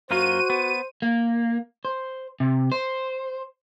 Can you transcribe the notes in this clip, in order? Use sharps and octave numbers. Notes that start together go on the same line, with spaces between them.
F#2 A#3 F4 F#4 C5 D#7
B3
A#3
C5
C3
C5